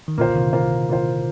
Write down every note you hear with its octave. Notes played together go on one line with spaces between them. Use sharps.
D#3
A#2 D3 A#3 F4 C5
C3 D#3
A#3 F4 C5
A#3 F4 C5